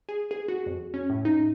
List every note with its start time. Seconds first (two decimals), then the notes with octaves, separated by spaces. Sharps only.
0.09 G#4
0.31 G#4
0.48 F#4
0.66 F2
0.94 C#4
1.10 A2
1.25 D#4